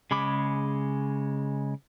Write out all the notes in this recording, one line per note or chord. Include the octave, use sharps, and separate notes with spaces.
C#3 G#3 B5 D6